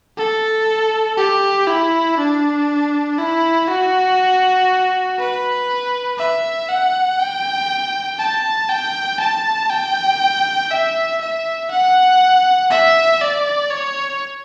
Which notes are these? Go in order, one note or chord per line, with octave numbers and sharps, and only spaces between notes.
A4
G4
E4
D4
E4
F#4
B4
E5
F#5
G5
A5
G5
A5
G5
E5
E5
F#5
E5
D5
C#5